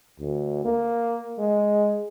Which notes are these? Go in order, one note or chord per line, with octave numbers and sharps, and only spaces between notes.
D2
A#3
G#3